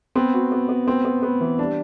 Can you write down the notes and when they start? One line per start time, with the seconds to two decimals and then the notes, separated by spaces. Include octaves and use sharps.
0.15 B3 C4
0.33 F#4
0.52 B3
0.69 B3
0.87 B3 C4
1.05 B3
1.23 B3
1.41 E3
1.59 G3 D4